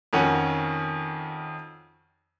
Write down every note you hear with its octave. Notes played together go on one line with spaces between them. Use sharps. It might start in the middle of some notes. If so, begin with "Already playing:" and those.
F2 D#3 C#4 F#4 F#5 D#7